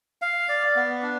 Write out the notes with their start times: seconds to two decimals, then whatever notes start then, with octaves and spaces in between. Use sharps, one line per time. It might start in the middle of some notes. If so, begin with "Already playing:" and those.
0.22 F5
0.49 D5
0.76 B3
1.03 D4